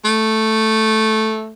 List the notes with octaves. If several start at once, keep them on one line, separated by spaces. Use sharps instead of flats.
A3